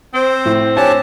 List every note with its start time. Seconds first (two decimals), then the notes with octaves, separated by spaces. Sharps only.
0.14 C4 C5
0.45 A2
0.77 D4 G4 C#5 G#5 A5